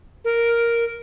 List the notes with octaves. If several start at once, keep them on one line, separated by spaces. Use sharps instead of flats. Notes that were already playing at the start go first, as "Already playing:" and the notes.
A#4